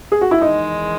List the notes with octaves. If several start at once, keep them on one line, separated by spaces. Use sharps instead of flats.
G#4
F#4
E4
E2 D#3 G#3 D#4